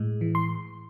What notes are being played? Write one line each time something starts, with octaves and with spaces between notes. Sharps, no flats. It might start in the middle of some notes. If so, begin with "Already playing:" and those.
Already playing: A2 G#3
E3
C6